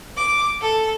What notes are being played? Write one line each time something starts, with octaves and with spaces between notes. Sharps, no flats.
D6
A4